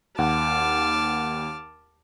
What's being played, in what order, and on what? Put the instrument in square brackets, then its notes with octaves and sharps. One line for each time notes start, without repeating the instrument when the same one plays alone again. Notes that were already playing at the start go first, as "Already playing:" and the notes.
[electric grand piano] D#2 F#5 [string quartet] A5 D6 F6